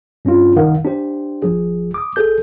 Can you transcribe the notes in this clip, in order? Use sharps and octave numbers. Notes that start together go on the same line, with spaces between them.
G2 C#4 D4 F4
C2 D#3 A#4 F5 F#5
D4 G4 C5
G#1 F3 G#4
D6 D#6
A1 G#4 A4 G6